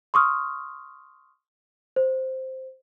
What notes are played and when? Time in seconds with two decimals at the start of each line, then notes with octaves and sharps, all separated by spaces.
0.14 C6 C#6 D#6 F6
1.96 C5